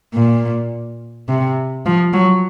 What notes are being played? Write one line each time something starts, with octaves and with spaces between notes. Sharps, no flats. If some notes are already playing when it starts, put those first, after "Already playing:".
A#2
C3
F3
F#3